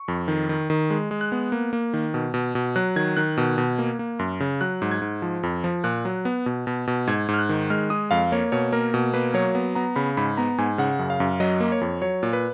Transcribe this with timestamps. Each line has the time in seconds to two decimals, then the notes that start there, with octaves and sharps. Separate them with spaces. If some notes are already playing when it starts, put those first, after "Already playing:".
Already playing: C#6
0.08 F2
0.28 D#3
0.49 D#3
0.70 D#3
0.90 G#3
1.11 G#3
1.21 F#6
1.32 B3
1.52 A#3
1.73 A#3
1.94 D#3
2.14 B2
2.34 B2
2.55 B2
2.76 F#3 F#6
2.96 D#3 G#6
3.17 D#3 F#6
3.37 B2
3.58 B2
3.79 A#3
3.99 A#3
4.19 F#2
4.40 C#3
4.61 F#3 F#6
4.82 G#2
4.91 G#6
5.02 G#2
5.22 F3
5.43 F2
5.64 F3
5.84 A#2 F#6
6.05 F#3
6.25 B3
6.46 B2
6.67 B2
6.87 B2
7.07 G#2 G#6
7.28 G#2
7.34 F6
7.39 F#6
7.49 D#3
7.70 G#3 F6
7.90 G#3 D#6
8.11 F2 F5
8.32 A#3 C#5
8.52 B2 C#5
8.72 A#3 A#4
8.94 B2
9.14 A#3 B4
9.34 F#3 C#5
9.55 B3
9.75 B3 A#5
9.96 C#3 B5
10.17 G#2 B5
10.37 B3 A#5
10.58 G#2 G#5
10.78 C#3 F#5
10.99 F#2
11.10 F5
11.20 F#2
11.40 F#3 D#5
11.60 A#3
11.72 C#5
11.81 F2
12.02 F#3 C#5
12.23 A#2
12.33 B4